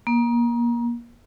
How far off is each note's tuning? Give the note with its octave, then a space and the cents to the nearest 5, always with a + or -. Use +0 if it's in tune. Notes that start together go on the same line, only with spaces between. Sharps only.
A#3 +30